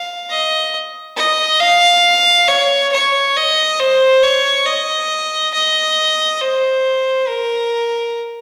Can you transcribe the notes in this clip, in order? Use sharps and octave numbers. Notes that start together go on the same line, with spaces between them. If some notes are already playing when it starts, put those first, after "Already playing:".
Already playing: F5
D#5
D#5
F5
C#5
C#5
D#5
C5
C#5
D#5
D#5
C5
A#4